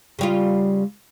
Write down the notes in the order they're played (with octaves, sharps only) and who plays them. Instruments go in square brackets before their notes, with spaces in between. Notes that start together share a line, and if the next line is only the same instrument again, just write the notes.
[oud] C#3 G3 F4